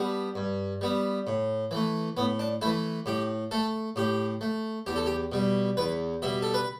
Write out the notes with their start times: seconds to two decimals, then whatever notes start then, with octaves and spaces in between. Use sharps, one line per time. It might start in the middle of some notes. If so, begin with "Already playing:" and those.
Already playing: G3 B3 D4
0.35 G2
0.81 G3 B3
1.27 A2
1.71 E3 A3
2.17 A2 B3
2.39 D4
2.62 E3 A3 E4
3.06 A2 G4
3.51 A3 A4
3.96 A2 G4
4.41 A3
4.86 E2 G4
4.96 A4
5.06 G4
5.32 B2 G3
5.77 E2 B4
6.22 B2 G3 E5
6.42 A4
6.54 B4